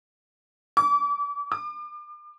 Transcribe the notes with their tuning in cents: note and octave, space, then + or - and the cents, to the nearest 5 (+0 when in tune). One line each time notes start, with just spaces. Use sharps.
D6 -35
D6 +40